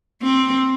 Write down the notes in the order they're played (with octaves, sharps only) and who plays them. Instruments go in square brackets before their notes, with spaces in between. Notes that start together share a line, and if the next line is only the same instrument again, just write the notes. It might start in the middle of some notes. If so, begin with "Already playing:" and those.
[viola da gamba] C4